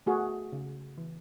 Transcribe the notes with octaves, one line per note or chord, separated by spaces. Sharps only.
A3 F#4 G#4
C#3
E3